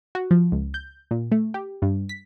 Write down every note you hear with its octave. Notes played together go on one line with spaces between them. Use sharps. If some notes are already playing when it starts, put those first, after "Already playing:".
F#4
F3
C#2
G6
A#2
A3
G4
G2
B6